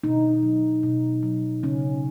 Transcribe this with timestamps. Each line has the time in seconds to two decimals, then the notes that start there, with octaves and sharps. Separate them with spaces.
0.04 B2 D#4
0.43 F#3
0.83 B2
1.23 F#3
1.63 C#3 C#4